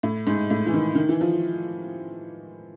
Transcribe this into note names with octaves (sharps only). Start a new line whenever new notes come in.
A2
G#2
A2
E3
D#3
D#3
E3
F3